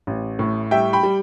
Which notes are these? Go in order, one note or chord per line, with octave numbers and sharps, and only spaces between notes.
A1
A2
G3 E5 G5
G5 B5
G3